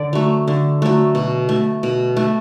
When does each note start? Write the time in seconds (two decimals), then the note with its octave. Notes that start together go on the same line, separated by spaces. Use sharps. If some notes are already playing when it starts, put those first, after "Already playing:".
Already playing: D3 D5
0.13 F#3 A3
0.47 D3
0.82 F#3 A3
1.15 B2
1.49 A3
1.83 B2
2.17 A3